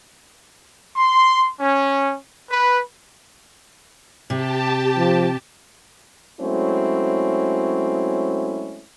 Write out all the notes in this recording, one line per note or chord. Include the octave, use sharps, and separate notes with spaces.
C6
C#4
B4
C3 G4 A5
F3
F#3 G#3 A3 C4 C#4 E4